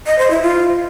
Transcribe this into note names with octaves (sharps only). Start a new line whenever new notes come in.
D#5
C5
E4
F4